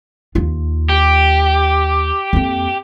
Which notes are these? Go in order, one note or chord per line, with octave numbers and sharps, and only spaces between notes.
D#2 F4
G4
F2 A#3